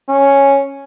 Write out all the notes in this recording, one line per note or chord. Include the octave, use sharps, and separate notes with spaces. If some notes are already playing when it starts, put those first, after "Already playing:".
C#4